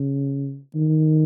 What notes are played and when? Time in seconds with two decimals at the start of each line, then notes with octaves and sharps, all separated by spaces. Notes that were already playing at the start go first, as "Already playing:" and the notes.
Already playing: C#3
0.75 D#3